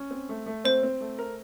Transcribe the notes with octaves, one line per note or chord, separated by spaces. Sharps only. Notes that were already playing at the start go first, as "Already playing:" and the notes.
Already playing: C#4
C4
A3
A3
C4 C5
C4
A3
A#4